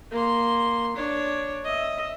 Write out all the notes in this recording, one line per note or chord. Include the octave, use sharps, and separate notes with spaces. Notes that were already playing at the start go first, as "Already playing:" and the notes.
A#3 C6
D4 C#5
D#5 E5